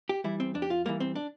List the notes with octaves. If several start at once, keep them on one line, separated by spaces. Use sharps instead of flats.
G4
E3 G3 E4
C4
F2 D4
G4
F4
E3 G3 A#3
C4
D4